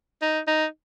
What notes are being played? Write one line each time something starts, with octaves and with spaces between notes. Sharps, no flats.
D#4
D#4